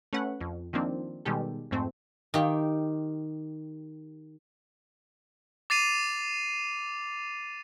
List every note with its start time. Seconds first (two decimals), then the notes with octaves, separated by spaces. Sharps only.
0.13 A3 C#4 B4 F#5
0.41 F2
0.73 D#3 F3 A#3 C4 D4
1.25 B2 D#3 G3 G#3 G4 A4
1.71 F2 G#2 A3 C4
2.34 D#3 G4
5.70 D6 A6 C7 D#7 F7